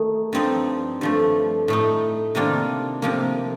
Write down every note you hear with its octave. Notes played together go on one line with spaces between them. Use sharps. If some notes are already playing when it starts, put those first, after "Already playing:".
Already playing: D#3 A3 D#4
G2 F3 C4 D#4
G2 F3 A3
A2 A3 D#4
C3 D#3 A#3 D4 F4
C3 F3 A#3